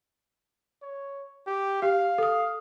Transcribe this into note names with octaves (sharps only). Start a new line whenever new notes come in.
C#5
G4
G4 F5
A4 D#6